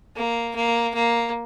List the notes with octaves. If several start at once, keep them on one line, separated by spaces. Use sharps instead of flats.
A#3
A#3
A#3